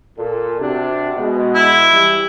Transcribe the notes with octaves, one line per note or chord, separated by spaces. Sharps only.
A#2 A4
C3 D4 F#4
B2 G#3
E4
E3 G3